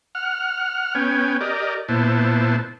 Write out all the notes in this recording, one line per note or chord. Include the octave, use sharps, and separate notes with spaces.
F#5 F6
B3 C#4 G5 G#5
G4 A#4 D5 D#5
A#2 B3 E4 C5 A5